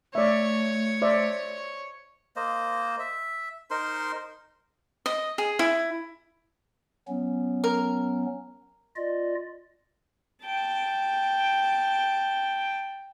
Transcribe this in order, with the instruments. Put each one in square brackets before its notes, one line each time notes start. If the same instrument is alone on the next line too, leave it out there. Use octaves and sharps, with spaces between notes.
[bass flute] A3 [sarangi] C#5 [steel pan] D5 E5
[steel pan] C5 D5 E5
[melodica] A#3 C5 D#5
E5
D#4 A#4 C5 C6
[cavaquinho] D#5
G#4
E4
[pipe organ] F#3 B3 C#4
[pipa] A#4
[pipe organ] F4 D5 D#5
[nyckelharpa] G5 A5